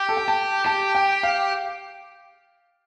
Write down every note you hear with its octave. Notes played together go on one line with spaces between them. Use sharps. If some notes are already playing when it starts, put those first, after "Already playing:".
Already playing: G4
A4
G5
A5
G4 A5
G5
F5